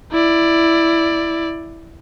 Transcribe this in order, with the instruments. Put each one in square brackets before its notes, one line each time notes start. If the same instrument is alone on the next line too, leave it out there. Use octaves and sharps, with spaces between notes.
[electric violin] E4 D5